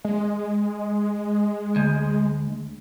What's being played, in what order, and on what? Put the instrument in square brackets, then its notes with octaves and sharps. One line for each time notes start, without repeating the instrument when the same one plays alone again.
[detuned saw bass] G#3
[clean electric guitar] D2